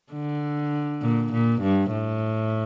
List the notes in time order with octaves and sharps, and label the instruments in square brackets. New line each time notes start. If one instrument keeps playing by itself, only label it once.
[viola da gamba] D3
A#2
A#2
G2
A2